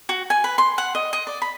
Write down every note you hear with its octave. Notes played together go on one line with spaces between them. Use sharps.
F#4
G#5
B4
C6
F#5
D#5
D#5
D5
B5